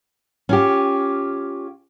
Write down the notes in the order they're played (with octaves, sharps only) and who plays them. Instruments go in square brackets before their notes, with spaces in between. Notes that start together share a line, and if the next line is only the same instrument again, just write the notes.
[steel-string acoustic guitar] C#4 F4 G4